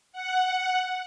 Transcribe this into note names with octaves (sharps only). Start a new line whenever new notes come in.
F#5